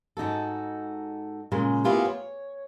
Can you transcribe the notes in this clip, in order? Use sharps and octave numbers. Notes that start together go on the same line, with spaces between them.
G#2 D#4 F#4 A4
A#2 C#3 G#3
A#3 B3 E4 F4 G4 G#4
C#5